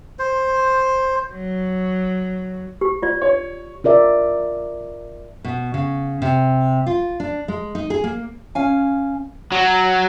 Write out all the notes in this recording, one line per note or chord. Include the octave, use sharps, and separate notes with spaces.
C5
F#3
G4
F4 D5
C#5
F4 A#4 D5 E5
B2
C#3
C3
F4
D4
G#3
D#4
G#4
A#3
C#4 F5 G#5
F#3